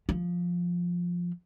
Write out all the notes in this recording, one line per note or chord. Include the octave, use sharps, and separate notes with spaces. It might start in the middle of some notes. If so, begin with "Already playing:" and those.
F3